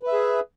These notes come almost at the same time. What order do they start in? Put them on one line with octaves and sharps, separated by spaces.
B4 E5 G#4